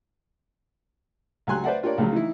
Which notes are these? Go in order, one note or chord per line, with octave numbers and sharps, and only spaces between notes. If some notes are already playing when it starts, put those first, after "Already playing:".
C#2 F#3 G4 G#5 C6 F#6
B4 C5 D5 E5 F#5
D4 F4 G4 A#4 C#5 D5
C#2 C#3 F3 F#3
E3 D#4 E4